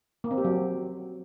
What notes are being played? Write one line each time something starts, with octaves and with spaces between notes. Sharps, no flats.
A#3
C4
G4
F#3